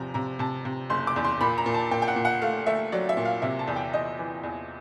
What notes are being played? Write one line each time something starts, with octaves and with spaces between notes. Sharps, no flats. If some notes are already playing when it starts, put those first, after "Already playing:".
Already playing: E2 C3 F3 A#5
C3 A#5
C3 A5
C3
F#1 C6
D6
E2
C6
A#2 B5
A#5
A#2
A5
A#2 G5
G5
F#5
A#2
F#5
A3 F5
A3 E5
F#3 D5
E5
A#2
F5
C3 E5
A5
E2
G5
E2 D#5
E3
E2